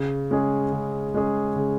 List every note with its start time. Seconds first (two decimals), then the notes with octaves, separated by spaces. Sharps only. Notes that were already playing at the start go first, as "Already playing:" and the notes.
Already playing: C#3
0.31 G#3 C#4 G#4
0.72 C#3
1.14 G#3 C#4 G#4
1.56 C#3